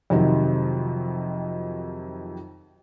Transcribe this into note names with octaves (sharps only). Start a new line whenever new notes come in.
F2 C3 D#3 F#3